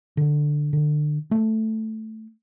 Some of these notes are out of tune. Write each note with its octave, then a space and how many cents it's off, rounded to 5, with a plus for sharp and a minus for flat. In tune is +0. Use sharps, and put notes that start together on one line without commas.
D3 +10
D3 +30
A3 +0